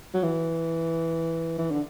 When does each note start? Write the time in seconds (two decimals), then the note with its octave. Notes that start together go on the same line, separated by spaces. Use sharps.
0.14 F#3
0.23 E3
1.58 E3
1.71 D3